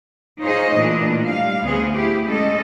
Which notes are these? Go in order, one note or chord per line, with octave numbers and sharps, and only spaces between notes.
D#4 F4 G#4 C5 C#5 D#5
A#2 E3 A3 A#3 D4
G3 F5
D2 B3 C4 G#4
E4 G4
G#3 C#4 A4 D#5